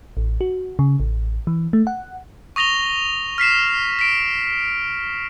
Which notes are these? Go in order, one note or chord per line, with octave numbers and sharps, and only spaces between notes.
A1
F#4
C#3
A1
E3
A3
F#5
C#6 D#6 A#6 F7 G7
F6 B6 C7 E7
B6 D7